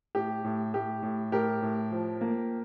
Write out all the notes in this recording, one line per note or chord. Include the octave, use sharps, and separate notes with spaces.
A2 G4
A2
A2 G4
A2
A2 G4 A#4
A2
F3
A#3